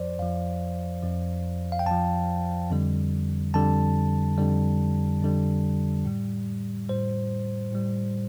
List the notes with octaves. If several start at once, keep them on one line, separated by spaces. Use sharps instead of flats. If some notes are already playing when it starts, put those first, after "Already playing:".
Already playing: F2 F3 C5 D5
F2 F3 F5
F2 F3
F5
G5
F2 F3 A5
F2 D3 G3
F2 D3 G3 A5
F2 D3 G3
F2 D3 G3
A2 G3
A2 G3 C5
A2 G3